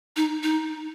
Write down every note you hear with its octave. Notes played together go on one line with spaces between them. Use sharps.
D#4
D#4